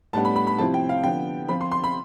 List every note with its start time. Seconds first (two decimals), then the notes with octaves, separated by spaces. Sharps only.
0.13 A2 G3 B3 D4 A5
0.25 B5
0.36 B5
0.47 B5
0.58 C3 F3 C4 E4 A5
0.74 G5
0.89 F5
1.04 D3 F3 B3 G5
1.48 F3 C4 F4 B5
1.61 C6
1.71 C6
1.84 B5